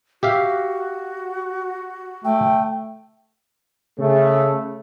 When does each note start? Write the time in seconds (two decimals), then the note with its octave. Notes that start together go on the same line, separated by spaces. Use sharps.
0.23 F#4 G4 E5 F5
2.25 A3 G5
3.99 C#3 A3